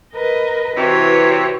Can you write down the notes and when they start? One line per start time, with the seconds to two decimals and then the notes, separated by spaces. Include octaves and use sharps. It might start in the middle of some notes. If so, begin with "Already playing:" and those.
0.15 A#4 B4 D#5
0.77 C3 E3 F#4 C#5